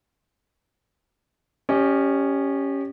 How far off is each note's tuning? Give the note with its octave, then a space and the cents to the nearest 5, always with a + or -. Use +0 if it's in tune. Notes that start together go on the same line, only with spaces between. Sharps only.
C#4 +0 G4 +0 D#5 -45